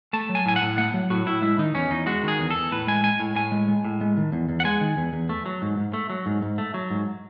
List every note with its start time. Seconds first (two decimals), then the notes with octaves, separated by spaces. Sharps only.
0.13 A3 A5
0.29 F#3
0.35 G#5
0.46 A2 G#5
0.56 F#5
0.62 A2
0.78 A3 F#5
0.94 F#3
1.10 A2 F#4
1.26 A2 E4
1.42 G#3 E4
1.58 D#3 D#4
1.74 E2 C#4
1.91 E2 D#4
2.06 G#3 F#4
2.23 D#3 G#4
2.39 E2
2.51 A4
2.56 E2
2.72 A2 B4
2.87 G#3 G#5
3.03 G#3 G#5
3.20 A2
3.36 A2 G#5
3.52 G#3
3.68 G#3
3.85 A2
4.01 G#3
4.17 D#3
4.32 E2
4.49 E2
4.60 F#5
4.65 G#3 G#5
4.81 D#3
4.97 E2
5.13 E2
5.29 A3
5.46 F#3
5.62 G#2
5.78 G#2
5.93 A3
6.10 F#3
6.26 G#2
6.42 G#2
6.58 A3
6.74 F#3
6.91 G#2